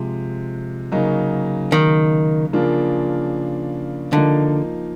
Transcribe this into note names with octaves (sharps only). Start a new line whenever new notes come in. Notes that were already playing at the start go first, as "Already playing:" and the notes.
Already playing: C3 F3 G#3
C#3 F#3 A#3 D#4
D#3
C#3 F3 A#3 D4 F4
D3 F3 A#3 D#4